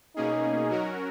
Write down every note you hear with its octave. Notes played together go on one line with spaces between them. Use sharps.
B2 A#3 C#4 D#4 G#4
F#3 C#4 F#4 A#4